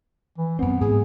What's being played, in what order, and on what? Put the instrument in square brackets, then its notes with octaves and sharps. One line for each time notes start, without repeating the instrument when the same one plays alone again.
[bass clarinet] E3
[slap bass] F#2 C4 [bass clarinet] B3
[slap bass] G#2 [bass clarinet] G#4